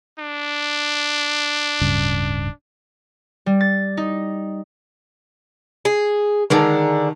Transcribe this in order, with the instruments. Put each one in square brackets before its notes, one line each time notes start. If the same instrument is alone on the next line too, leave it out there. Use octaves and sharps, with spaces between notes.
[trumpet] D4
[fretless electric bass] D1 G2 C#3
[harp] G3
A6
D#4
[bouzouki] G#4
[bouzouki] D3 G#3 A#5 [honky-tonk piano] D#3 A5